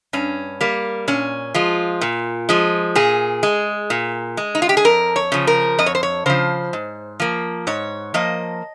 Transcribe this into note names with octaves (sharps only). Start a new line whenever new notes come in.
G2 C#4
G3 A#3
A#2 C#4
F3 G#3 F4
A#2
F3 G#3
A#2 G#4
G#3
A#2
G#3
D#4
F4
G4
G#4
F2 A#4
C#5
C#3 F3
A#4
F2 D#5
C#5
C5
C#5
C#3 F3 C5
G#2
F3 A#3
G#2 C#5
F3 A#3 D#5